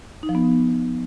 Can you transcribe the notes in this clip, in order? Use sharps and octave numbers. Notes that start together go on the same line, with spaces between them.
D#4
F3
B3